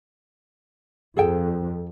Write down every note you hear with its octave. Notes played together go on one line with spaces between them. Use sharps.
F2 G#4 A4 G5